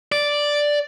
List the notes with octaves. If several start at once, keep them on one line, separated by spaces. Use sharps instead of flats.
D5